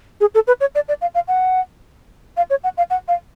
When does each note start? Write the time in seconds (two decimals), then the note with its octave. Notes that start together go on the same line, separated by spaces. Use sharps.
0.21 G#4
0.34 A4
0.47 B4
0.60 C#5
0.75 D5
0.88 D5
1.01 F5
1.15 F5
1.28 F#5
2.37 F5
2.50 C#5
2.64 F#5
2.77 F5
2.90 F#5
3.08 F5